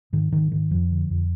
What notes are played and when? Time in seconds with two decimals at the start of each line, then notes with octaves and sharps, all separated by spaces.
0.13 G#2 D#3
0.32 G#2 D#3
0.52 G#2 D#3
0.71 F2 F3
0.91 D3
1.10 F2